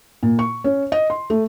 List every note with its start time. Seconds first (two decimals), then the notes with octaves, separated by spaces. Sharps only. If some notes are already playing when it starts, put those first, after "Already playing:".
0.23 A#2
0.39 C#6
0.64 C#4
0.92 D#5
1.10 C6
1.30 A3